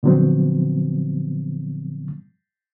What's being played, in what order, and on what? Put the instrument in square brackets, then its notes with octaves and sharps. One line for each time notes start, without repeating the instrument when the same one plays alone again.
[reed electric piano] A#2 D3 F3 F#3 B3 C4